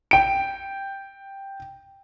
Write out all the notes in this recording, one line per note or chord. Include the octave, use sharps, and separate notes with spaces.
G5 D7